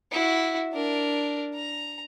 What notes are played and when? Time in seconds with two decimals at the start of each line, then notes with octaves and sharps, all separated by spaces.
0.12 E4 F#4
0.73 D4 A#4
1.54 A#5